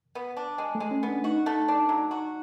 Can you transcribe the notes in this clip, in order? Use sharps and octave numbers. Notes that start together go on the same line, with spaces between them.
B3
D4
G#3
A3
G#3
C#4
B3
D4
D#4 F#4
A3
D4
F#3
F#4